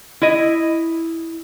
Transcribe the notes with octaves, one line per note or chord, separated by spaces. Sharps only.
E4 D#5